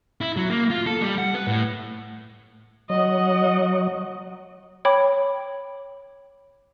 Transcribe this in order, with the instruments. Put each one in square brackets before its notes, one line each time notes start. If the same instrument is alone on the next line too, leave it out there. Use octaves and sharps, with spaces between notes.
[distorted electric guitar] E4
F#3
A#3
F4
A4
G3
F#5
B4
A2
[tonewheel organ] F#3 [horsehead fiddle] D#5 F#5
[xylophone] C#5 G5 B5 D6